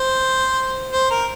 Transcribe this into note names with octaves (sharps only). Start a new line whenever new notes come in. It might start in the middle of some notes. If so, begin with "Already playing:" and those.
Already playing: C5
C5
A#4